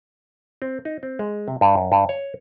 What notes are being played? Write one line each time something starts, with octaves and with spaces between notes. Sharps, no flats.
C4
D#4
C4
G#3
C3
G2
F#2
G2
C#5